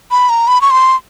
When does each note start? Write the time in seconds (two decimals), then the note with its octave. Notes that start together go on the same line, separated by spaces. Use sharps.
0.11 B5
0.29 A#5
0.47 B5
0.61 C#6
0.70 C6